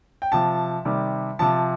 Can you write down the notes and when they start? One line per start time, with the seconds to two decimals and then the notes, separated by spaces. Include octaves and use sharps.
0.22 G5
0.32 C3 F3 A5
0.85 C3 D#3 G3
1.39 C3 F3 A5